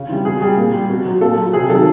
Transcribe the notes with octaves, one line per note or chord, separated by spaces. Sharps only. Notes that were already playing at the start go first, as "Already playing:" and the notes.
Already playing: C#3
E3 G3
B2 G#4
G3 G#4
A#2
G3
B2
F#3
A#2 A4
F#3
C3 G#4
D#3 F#3 A4